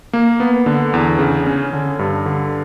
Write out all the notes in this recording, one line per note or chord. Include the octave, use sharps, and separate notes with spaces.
A#3
B3
D3
E2
C#3
C#4
D3
G2
D3